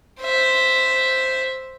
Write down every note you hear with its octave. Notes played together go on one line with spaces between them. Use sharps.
C5 E5